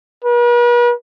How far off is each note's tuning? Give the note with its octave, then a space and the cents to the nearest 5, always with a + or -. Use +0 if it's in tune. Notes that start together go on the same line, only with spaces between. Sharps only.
B4 -45